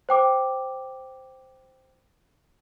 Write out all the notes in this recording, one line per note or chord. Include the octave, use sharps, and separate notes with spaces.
C5 G5 D6